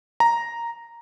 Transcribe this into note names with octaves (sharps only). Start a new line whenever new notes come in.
A#5